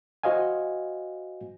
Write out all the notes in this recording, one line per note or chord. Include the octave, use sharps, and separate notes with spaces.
F#4 C5 D#5 F5 G#5